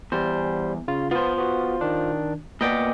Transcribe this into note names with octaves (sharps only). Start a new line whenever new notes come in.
E2 G3 C5
C#3 F4
B3 F4 C5
B3 F#4
D#3 D4
A#2 B3 D5 D#5 G5 D6